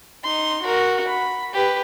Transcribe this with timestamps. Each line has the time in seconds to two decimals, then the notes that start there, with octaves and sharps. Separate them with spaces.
0.24 D#4 C6
0.62 F#4 A#4
1.07 B5
1.53 G4 B4